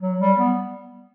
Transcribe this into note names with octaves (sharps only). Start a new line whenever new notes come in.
F#3
G3
B3